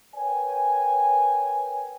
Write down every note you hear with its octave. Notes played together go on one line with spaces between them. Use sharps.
A#4 B4 C#5 G5 G#5